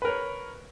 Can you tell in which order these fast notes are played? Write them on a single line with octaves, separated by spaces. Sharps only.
B4 A#4 C#5